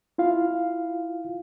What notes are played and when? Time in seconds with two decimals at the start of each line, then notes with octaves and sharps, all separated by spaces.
0.18 E4 F4 F5